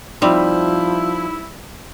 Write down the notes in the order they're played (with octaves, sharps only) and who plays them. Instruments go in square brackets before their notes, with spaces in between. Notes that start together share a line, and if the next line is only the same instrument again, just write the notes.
[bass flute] F3 [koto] G3 C4 [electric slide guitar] D#4 E5 [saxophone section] E4